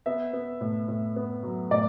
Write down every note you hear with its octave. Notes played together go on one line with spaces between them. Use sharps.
B3 E5
B3
A2
A2
B3
F#3
A2 D5